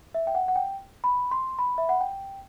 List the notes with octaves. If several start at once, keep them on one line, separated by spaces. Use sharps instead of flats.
E5
G5
F#5
F#5
G5
B5
C6
B5
E5
F#5
G5